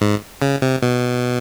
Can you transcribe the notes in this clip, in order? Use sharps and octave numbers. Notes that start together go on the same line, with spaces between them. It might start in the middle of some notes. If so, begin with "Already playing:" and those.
G#2
C#3
C3
B2